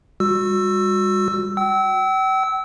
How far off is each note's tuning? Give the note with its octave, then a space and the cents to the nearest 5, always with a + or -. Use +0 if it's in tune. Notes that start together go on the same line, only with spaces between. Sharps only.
G3 +30 F#4 -25 E6 +10
G5 -40 E6 -20